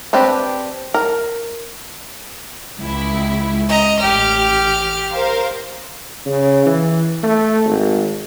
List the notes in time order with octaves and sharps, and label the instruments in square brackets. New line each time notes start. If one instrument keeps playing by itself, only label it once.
[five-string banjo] C4 D4 G4 B4
A#4
[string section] C#2 E4
[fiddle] D#5 A#5
[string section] A1 [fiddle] G4 F6
[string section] A#4 C5 F5
[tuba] C#3
E3
A3
G#1